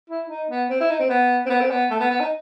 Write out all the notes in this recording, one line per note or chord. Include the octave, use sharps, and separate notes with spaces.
E4
D#4
B3
C4
E4
D#4
C4
B3
C4
B3
C4
B3
A3
B3
B3
D#4